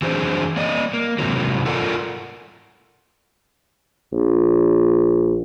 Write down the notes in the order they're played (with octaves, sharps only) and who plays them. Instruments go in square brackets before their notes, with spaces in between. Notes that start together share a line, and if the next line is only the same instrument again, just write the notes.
[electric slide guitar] E3 F#3 C4 D4 G#4 C5
A#3 D5 D#5
A#3
G#2 C3 E3 F#3
F4 A4 A#4 D5 F#5
[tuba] A#1